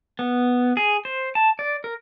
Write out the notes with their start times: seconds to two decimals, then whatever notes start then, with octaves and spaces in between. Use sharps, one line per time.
0.19 B3
0.77 G#4
1.05 C5
1.35 A5
1.59 D5
1.84 A#4